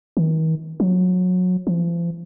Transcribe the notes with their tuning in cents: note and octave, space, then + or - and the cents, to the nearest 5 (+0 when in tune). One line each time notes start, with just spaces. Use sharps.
D#3 +45
F#3 -25
F3 -40